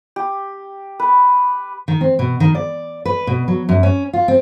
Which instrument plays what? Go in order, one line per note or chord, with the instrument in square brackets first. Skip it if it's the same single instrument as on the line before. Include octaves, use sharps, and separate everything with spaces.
[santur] G4
B4
[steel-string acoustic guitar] D#3
C4
B2
D#3
D5
B4
B2
F#3
F#2
C#4
F4
C4